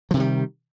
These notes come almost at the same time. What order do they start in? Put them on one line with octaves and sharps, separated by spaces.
F3 C3 D#3 G3